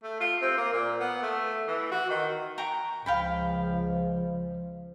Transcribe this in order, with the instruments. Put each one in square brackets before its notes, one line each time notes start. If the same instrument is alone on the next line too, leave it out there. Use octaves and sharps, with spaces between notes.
[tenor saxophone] A3
F4
C4
A#3
A#2
B3
A3
E3
F#4
D#3
[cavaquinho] G5 A#5 C#6
[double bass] C#2 F3 [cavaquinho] F5 G5 B5